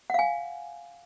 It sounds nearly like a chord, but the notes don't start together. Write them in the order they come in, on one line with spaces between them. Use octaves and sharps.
F#5 F5 G#5